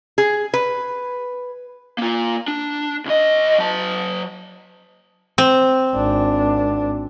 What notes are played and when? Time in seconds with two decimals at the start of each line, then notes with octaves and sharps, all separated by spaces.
0.18 G#4
0.54 B4
1.98 A#3 F4
2.48 D4
3.05 C#2 D#5
3.59 F#3 A5
5.38 C4
5.95 G#1 D4